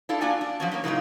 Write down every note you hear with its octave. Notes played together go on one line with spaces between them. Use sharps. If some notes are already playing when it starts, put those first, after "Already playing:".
D4 E4 F4 A4
A#3 D4 F4 F#4 D5 G#5
D4
F3 F#3 C#4
A#3 C#4
A2 C#3 F#3 A#3 D#4 F4